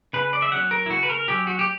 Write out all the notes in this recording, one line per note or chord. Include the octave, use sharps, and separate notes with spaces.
C#3 B4
D5
E5
F#3 C#4 F#5
A#4
E4
C#3 F#4
B4
A#4
F#3 C#4 G4
F#4
G4